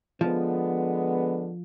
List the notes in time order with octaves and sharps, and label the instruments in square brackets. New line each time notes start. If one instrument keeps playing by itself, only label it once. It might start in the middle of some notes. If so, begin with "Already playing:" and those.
[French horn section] D3 G#3 B3 [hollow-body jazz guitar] F3